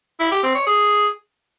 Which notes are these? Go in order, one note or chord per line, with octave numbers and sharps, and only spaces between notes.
E4
G4
C4
C#5
G#4